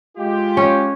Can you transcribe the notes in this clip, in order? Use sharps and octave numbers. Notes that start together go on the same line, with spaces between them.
G#3 F4 G4
C#4